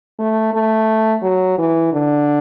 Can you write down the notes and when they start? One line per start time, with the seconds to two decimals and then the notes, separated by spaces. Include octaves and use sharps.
0.19 A3
0.54 A3
1.23 F#3
1.58 E3
1.93 D3